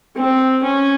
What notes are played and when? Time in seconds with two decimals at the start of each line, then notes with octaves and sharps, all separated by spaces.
0.16 C4
0.63 C#4